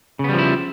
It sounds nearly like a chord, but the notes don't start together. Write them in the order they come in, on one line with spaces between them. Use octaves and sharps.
C#3 B3 G3 F3 E4